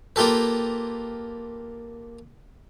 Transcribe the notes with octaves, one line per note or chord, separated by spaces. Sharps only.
A#3 F4 G4 A4 B4